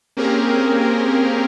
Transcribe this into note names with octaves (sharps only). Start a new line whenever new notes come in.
A#3 C4 C#4 G4 G#4 A#4